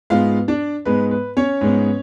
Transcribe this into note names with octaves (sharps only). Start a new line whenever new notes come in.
G#2 G#3 B3 F4 F5
D4 D5
G#2 G#3 B3 B4
B4
C#4 C#5
G#2 G#3 B3